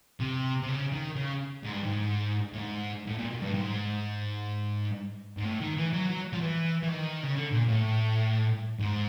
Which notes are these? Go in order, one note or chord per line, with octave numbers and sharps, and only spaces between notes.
C3
C3
C#3
D#3
C#3
G#2
G2
G#2
A2
G#2
A2
A#2
B2
G2
G#2
G#2
A2
D#3
E3
F#3
F#3
F3
E3
E3
D#3
C#3
D3
A#2
A2
G#2